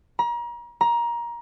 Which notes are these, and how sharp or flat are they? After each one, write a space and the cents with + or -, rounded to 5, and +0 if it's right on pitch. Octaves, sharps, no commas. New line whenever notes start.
A#5 +35
A#5 +20